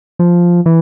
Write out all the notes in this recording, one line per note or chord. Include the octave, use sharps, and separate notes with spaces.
F3
E3